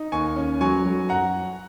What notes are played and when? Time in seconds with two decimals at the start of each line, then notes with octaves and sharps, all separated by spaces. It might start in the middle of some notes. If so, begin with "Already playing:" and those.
Already playing: D#4
0.12 D#2 G#5 C#6
0.36 C#4
0.61 F#3 G#5 C#6
0.85 F#3
1.09 F#2 F#5 A#5